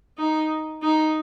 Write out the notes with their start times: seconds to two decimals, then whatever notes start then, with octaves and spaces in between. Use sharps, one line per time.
0.18 D#4
0.82 D#4